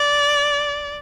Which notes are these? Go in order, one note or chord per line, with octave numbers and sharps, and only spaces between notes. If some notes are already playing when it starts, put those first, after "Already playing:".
Already playing: D5